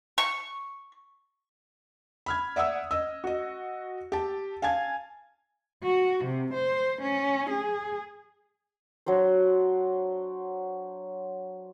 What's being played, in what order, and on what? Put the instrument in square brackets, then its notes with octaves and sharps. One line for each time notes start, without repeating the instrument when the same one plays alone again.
[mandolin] C#6
[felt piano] B5 F6 G#6
D5 E5 F#5 D#6 E6
D#5 E6
F#4 D#5
G4 A5
F5 G#5 A5 G#6
[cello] F#4
C3
C5
C#4
G#4
[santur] F#3 D4 C5